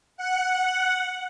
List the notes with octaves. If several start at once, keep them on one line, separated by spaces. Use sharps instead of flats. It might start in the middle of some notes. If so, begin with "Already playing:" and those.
F#5